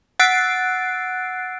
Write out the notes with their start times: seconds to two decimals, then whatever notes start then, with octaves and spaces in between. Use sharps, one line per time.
0.19 F#5 E6 F#6 A6 C7 D7